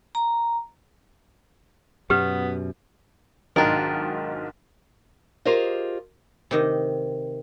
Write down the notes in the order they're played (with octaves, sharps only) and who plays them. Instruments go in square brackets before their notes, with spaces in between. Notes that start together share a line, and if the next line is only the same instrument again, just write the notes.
[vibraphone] A#5
[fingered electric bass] F#2 B2 [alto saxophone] B3 [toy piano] G4 B4
[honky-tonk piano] B1 G#2 [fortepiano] D#3 [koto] D4 F4 [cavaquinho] A#4 G5
[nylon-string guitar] F4 G4 G#4 A#4 C5 D#5
[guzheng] C3 D#3 D#5